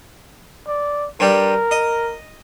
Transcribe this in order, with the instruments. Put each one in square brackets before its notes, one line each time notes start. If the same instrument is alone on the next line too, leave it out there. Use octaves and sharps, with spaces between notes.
[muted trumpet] D5
[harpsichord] G2 G3 [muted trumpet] A#4
[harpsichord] D#5